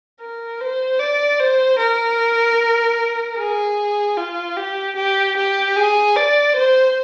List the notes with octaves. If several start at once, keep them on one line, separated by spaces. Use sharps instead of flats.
A#4
C5
D5
C5
A#4
G#4
F4
G4
G4
G4
G#4
D5
C5